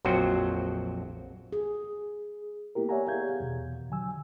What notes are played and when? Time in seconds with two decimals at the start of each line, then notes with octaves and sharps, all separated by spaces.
0.05 A#1 F2 F#3 F#4 C5 G5
1.53 G#4
2.75 A#3 B3 E4 G4 A#4
2.89 C#5 D5 E5 F#5 G#5 A#5
3.07 B3 G4 G#4 F5 G6 G#6
3.40 E2 B2
3.90 D3 F#3 G#5 E6